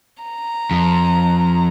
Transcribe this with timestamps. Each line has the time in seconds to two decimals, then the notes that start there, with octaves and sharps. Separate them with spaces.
0.23 A#5
0.71 F2